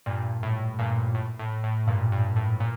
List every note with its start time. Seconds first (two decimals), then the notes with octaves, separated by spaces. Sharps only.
0.06 G2 A#2
0.43 A2
0.79 G2 A#2
1.15 A2
1.39 A2
1.64 A2
1.87 G2 A#2
2.12 G2
2.36 A2
2.60 A#2